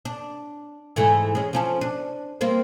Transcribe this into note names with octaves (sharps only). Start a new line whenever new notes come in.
D4
G#2 E3 A3
G#3 C#4
F3 C#4 A4
D4
G3 A#3 C4